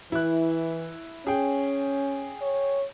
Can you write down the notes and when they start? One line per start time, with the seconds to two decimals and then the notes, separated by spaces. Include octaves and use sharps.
0.12 E3 E4 F#6
1.27 C#4 G#4 G5
2.42 C#5